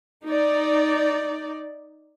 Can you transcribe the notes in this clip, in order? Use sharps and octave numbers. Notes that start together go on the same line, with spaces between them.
D#4 D5